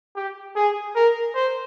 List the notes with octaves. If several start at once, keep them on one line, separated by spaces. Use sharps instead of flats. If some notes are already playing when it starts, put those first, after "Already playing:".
G4
G#4
A#4
C5